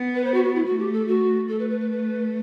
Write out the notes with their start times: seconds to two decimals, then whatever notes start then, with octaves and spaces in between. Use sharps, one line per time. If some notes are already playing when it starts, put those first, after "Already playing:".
Already playing: B3
0.15 B4
0.24 C5
0.34 F#4
0.44 F#4
0.55 E4
0.65 A3 F#4
0.79 G4
0.93 A4
1.07 F#4
1.48 A3 A4
1.60 B4
1.70 B4
1.81 B4
1.91 B4